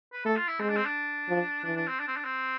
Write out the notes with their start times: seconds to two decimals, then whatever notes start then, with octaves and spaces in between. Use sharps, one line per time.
0.13 B4
0.25 A3 A4
0.36 F4
0.48 E4
0.60 G#3 C4
0.69 D4
0.77 C4
0.86 D4
1.29 F3
1.64 E3 D4
1.76 D4
1.88 C4
2.00 D4
2.08 C4
2.17 D4
2.25 C4